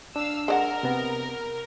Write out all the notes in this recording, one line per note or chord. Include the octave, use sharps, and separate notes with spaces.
D4 F5 E6
G#3 A#4 D5 F#5
C3 B3